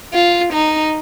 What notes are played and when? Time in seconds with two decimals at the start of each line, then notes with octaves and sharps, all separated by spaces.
0.14 F4
0.53 D#4